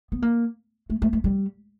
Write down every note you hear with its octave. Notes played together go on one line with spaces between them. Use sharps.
B3
A#3
A3
A3
A3
G3